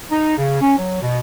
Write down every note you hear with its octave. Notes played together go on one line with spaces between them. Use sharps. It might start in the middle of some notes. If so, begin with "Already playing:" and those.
D#4
C#3
C#4
F#3
B2